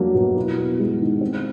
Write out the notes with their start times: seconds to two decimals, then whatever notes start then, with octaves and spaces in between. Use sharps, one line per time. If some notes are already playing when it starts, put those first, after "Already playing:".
Already playing: F#3 A#3 D4
0.14 B2
0.36 E4
0.57 B3
0.79 G#3
1.00 D#3
1.21 C4